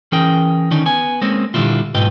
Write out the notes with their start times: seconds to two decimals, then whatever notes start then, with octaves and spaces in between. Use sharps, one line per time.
0.12 E3 C#4 G#4 A#4 G5
0.71 D3 D#3 C#4 D#4
0.86 B3 G#5
1.21 G#3 A#3 C4 C#4
1.54 A#2 D3 G3 A3 E4 F4
1.95 B1 G#2 F4 B4 D#5 G5